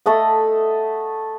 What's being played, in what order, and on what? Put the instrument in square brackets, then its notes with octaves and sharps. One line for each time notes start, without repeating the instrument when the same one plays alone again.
[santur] A3 A4 D#5 F#5